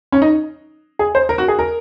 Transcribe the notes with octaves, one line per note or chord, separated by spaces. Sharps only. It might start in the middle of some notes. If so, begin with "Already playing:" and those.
C#4
D#4
G#4
C5
A#4
F#4
G#4
A#4